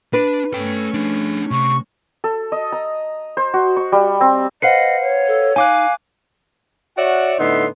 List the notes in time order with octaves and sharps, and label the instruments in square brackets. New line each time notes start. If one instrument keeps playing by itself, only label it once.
[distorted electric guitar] D4 [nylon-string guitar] B4
[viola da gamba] A3 C#4 [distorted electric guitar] A4 G5
[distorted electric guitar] D4 G#4
[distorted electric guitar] C3 [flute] C#6
[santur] A4
D#5
A#5
C5
F#4
C#6
G3
C4
[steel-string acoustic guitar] B4 C5 F#5 [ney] D#5 [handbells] F5 C7 C#7
[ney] C#5
[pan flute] A4
[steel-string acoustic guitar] D#4 [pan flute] F5 [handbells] G#5 D6 F#6
[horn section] F#4 C#5 D5 E5 F#5
A2 D3 B3 D#4 E5 C6